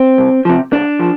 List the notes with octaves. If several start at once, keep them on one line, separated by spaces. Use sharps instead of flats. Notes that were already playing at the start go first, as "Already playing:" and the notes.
Already playing: C4
C2
C3 F3
C2 D4
F3